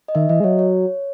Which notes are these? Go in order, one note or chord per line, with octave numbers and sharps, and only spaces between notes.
D#5
D#3 E5
E3 D#5
G#3
F#3 C#5
C#5